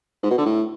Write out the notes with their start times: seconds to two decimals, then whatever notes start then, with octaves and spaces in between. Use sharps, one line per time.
0.23 G#2
0.31 B2
0.38 D3
0.46 A2